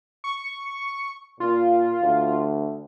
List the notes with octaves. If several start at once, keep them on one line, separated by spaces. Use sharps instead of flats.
C#6
A#2 F4
D2